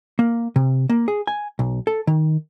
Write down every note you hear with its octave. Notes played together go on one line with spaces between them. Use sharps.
A#3
C3
A#3
G#4
G#5
B1
A4
D#3